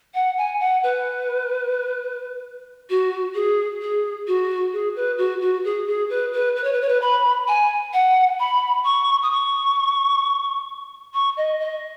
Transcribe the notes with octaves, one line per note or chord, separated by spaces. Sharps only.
F#5
G#5
F#5
B4
F#4
G#4
G#4
F#4
G#4
B4
F#4
F#4
G#4
G#4
B4
B4
B4
C#5
B4
C#5
B4
B5
G#5
F#5
B5
C#6
D#6
C#6
C#6
D#5
D#5